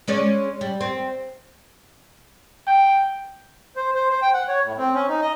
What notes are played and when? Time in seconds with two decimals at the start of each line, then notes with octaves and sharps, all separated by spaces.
0.08 G#3 C#4 D5
0.61 G3
0.81 C4
2.68 G5
3.76 C5
3.94 C5
4.10 C5
4.22 G5
4.34 F#5
4.48 C#5
4.64 A2
4.78 C4
4.95 C#4
5.08 D#4
5.21 D#5